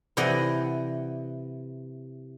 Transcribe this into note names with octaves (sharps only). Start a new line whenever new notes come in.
C3 E3 D5 D#5 F#5